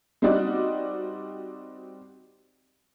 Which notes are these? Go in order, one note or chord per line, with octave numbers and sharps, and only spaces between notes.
G3 C4 D#4 F#4 D5 D#5